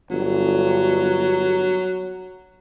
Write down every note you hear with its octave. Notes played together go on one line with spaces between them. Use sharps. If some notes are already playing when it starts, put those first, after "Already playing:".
G1 F#3